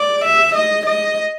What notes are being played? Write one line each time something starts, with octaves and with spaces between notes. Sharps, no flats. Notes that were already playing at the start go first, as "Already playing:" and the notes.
Already playing: D5
E5
D#5
D#5